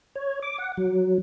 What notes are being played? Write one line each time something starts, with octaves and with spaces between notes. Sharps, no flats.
C#5
D6
F#5
F#3